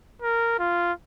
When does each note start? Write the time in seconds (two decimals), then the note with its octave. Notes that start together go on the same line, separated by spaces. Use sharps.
0.22 A#4
0.59 F4